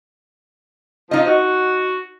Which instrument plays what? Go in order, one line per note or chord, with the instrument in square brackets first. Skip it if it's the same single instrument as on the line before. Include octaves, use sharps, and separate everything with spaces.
[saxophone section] F3 [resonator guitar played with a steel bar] D#4 D#5
[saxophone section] F#4